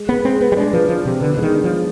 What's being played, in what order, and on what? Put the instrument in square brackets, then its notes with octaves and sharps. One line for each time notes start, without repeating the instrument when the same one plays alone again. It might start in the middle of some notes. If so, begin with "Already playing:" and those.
Already playing: [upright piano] G#3
[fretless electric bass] B3 [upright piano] B4
[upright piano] G#3 [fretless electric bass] C4
[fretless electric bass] B3 [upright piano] B4
[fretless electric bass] G3
[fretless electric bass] G#3 [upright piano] D4
[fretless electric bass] F3 [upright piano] B4
[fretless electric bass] F3 [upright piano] D4
[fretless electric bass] C3 [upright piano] G4
[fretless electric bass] D3 [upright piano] B3
[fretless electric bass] D3 [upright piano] G#3
[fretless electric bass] D#3
[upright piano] D4
[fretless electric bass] F3
[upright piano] G#3